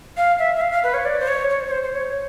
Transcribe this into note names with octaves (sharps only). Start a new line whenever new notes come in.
F5
E5
E5
F5
F5
B4
C#5
D5
C5
C#5
C#5
C5
C#5
C5
C5
C#5